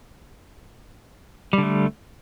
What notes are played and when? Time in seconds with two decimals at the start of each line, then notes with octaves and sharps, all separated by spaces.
1.53 G3
1.58 D3
1.63 A3